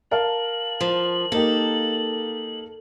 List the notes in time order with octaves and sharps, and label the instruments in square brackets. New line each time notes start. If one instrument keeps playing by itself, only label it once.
[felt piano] A#4 F5 A5 [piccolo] F#7
[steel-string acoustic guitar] F3
[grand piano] A#3 D#4 G4 [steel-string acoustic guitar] A4